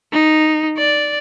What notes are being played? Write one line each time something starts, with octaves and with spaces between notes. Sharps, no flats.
D#4
D5